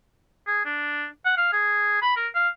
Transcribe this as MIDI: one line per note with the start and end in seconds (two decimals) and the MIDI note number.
0.47 0.64 68
0.65 1.06 62
1.25 1.33 78
1.37 1.48 77
1.53 1.99 68
2.02 2.16 83
2.17 2.28 70
2.35 2.49 77